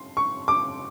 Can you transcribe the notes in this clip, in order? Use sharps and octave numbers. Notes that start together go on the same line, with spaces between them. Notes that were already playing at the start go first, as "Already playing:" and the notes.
Already playing: C6
C#6
D6